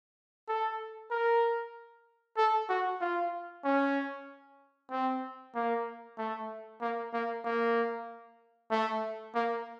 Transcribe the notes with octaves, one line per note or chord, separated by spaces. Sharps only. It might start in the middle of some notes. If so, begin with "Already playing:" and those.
A4
A#4
A4
F#4
F4
C#4
C4
A#3
A3
A#3
A#3
A#3
A3
A#3